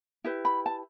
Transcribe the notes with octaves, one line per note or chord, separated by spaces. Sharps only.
E4 G4 B4
B5
A5